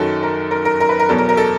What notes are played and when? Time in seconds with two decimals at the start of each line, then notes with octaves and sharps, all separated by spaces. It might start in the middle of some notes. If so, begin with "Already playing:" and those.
Already playing: F#2 D#3 F#3 A4
0.23 A#4
0.51 A#4
0.65 A#4
0.80 A#4
0.89 B4
0.99 A#4
1.09 E2 B2 F#3 A4
1.18 A#4
1.29 A#4
1.37 A4